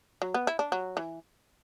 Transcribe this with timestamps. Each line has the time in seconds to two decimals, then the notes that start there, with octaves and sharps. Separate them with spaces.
0.22 F#3
0.34 B3
0.47 E4
0.59 D4
0.72 F#3
0.97 E3